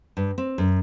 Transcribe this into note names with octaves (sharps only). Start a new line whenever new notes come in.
G2
C4
F#2